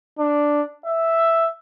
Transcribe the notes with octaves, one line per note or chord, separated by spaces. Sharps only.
D4
E5